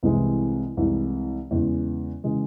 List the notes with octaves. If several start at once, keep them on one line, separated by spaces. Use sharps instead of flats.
C2 C3 E3 G#3
C2 C3 E3 G#3
E2 C#3 E3 G#3
C#3 E3 G#3